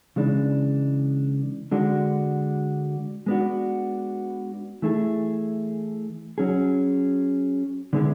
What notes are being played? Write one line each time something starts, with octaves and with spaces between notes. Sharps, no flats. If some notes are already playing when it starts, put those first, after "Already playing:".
C#3 E3 G#3 D4
D3 G#3 D4 F#4
G#3 B3 D4 F#4
E3 A3 E4 G#4
F#3 C#4 G#4
D3 G#3 B3 E4 G#4